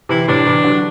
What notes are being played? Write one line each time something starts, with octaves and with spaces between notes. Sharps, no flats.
C3 E3 E4
A2 C3 D4
C3 E3
D3 F#3